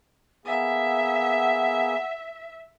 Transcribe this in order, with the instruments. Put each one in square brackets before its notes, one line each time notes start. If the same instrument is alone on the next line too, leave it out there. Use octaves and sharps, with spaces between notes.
[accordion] A#3 B3 G#4 [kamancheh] E5 [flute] F#5